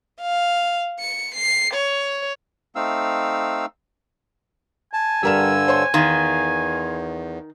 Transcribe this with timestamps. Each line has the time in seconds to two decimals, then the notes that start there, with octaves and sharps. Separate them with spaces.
0.21 F5
1.00 C#7
1.35 C7
1.75 C#5
2.76 A3 C4 D#4 F5 E6
4.93 G#5 A5
5.23 G2 D3 G3 A#4 E6 E7
5.68 C5 C#5 C6
5.94 E2 D#3 F5 C6